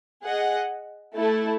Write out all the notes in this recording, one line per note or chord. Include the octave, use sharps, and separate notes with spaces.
G#4 D#5 F#5
A3 E4 A4